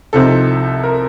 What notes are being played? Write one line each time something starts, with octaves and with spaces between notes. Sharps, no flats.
C2 C3 F3 C4 D#4 A4
A#4